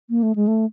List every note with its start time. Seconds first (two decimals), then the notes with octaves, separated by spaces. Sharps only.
0.10 A#3
0.23 A3
0.35 G#3
0.47 A3